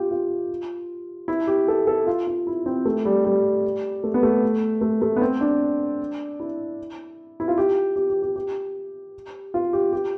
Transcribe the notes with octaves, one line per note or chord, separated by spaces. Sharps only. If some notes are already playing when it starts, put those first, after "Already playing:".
Already playing: F4 G4
F4
E4
G4
A4
A4
F4
F4
E4
C4
A3
G3
G3
A3
B3
A3
A3
A3
B3
C4
D4
E4
E4
F4
G4
G4
G4
G4
G4
F4
G4
G4